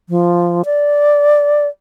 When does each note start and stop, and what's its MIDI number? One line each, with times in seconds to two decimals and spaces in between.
0.09 0.62 53
0.65 1.67 74